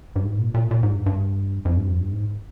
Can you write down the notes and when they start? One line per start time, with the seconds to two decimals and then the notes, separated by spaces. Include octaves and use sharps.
0.16 G2
0.24 G#2
0.39 A#2
0.54 A#2
0.71 A#2
0.83 G#2
0.95 G2
1.06 G2
1.65 F2
1.77 G2
1.88 F2
2.00 G2
2.12 G#2